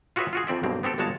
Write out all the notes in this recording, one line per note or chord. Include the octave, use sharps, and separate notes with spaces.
F4 F#4 G#4 B4 C#5 E5
F4 F#4 G#4
F2 C4 D5 E5
B1 G2 B2 A#3 C4
B3 C4 G4 A4
G1 G2 G#3 F#4 C#5 A5